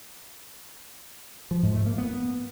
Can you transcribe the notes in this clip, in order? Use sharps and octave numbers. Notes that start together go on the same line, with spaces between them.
F3
G#2
A3
A#3
B3